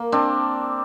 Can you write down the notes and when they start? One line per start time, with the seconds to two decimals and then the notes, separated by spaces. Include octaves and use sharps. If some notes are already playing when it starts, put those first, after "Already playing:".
Already playing: A#3
0.12 C4 D4